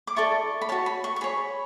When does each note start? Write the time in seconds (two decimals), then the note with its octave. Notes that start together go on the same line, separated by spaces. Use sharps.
0.07 D6
0.16 E4 A4 D5 C#6
0.62 B5
0.69 F#4 C#5 A5
0.86 B5
1.04 C#6
1.16 C#6
1.21 G#4 C#5 B5